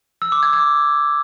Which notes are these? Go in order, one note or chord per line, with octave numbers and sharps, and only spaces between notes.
E6
D6
G#6
D6